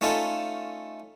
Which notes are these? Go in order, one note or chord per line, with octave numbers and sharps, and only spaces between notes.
A3 C#4 D#4 F4 A4